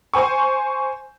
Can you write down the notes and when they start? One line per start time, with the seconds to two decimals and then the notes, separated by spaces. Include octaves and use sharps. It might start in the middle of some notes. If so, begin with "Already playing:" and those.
0.14 C5 G#5 C#6